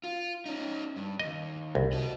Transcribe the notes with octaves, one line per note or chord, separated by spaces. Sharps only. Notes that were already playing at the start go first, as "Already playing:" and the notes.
F4
C#4 D#4
G2
D#2 D#5
C2
F#4 D#5